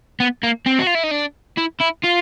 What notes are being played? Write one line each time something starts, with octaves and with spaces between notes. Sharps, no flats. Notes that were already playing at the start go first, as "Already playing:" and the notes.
B3
A#3
C4
F#4
F4
E4
D#4
D4
E4
E4
F4